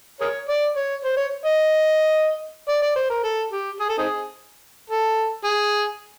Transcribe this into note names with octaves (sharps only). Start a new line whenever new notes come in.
G#4 A#4 C#5
D5
C#5
C5
C#5
D#5
D5
D5
C5
A#4
A4
G4
G#4
A4
C4 D#4 G#4
A4
G#4